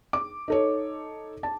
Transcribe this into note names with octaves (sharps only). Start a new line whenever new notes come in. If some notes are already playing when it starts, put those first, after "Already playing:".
D6
D#4 A4 C#5
A5